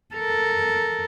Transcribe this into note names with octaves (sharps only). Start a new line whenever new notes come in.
A4 A#4